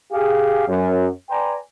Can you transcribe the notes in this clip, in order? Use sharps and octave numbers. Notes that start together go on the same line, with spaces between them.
G4 G#4 F5
F#2
B4 D5 G5 G#5 A#5 C6